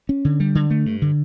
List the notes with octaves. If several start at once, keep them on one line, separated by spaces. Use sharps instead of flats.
C#4
D3
G3
D3
A3
G2
D3